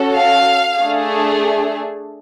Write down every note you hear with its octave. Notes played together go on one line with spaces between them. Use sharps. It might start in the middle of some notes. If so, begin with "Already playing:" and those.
Already playing: C#4 F#4 A4
F5
A3 D4 G#4